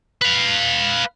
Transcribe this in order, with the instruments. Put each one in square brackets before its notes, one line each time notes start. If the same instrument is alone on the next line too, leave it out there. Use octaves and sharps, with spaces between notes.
[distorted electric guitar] B4 F5